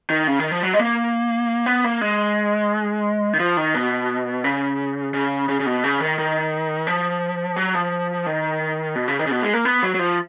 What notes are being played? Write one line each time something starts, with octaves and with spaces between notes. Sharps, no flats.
D#3
C#3
D#3
F3
F#3
G#3
A#3
B3
A#3
G#3
D#3
F3
D#3
B2
C#3
C#3
C#3
C#3
B2
C#3
D#3
D#3
F3
F#3
F3
D#3
B2
C#3
D#3
C#3
B2
G#3
A#3
B3
F#3
F#3
F3